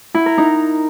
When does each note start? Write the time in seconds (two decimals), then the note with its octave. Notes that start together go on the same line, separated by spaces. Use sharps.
0.14 E4
0.26 A#4
0.38 D#4